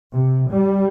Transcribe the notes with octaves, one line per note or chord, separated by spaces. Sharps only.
C3
G3